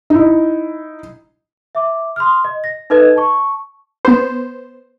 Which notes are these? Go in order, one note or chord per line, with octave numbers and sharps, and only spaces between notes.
D#4 E4
E5 D6
C6 D#6 F6
D#5
A#6
D#4 A4 B4 D#5 G#6
A5 C#6
B3 C5